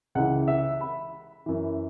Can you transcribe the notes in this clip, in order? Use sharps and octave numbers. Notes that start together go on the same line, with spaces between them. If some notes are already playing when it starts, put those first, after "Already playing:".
C#2 C#3 E3 F#5
E5
B5
F#2 E3